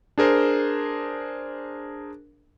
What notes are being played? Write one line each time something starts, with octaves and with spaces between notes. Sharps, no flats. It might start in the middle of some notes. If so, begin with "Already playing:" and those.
D4 G#4 A#4 C5